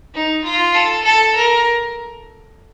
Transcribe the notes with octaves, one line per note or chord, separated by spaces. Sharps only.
D#4
F4
A4
A4
A#4